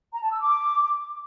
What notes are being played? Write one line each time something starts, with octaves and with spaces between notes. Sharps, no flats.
A#5
A5
E6
D6